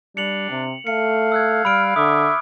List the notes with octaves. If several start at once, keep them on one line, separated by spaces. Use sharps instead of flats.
G3 D4 C#7 F7 F#7
C3
A3 F5 C#7
E6 F#6 G#6
G3 B5 F6 D7
D3 E5 D6 D#6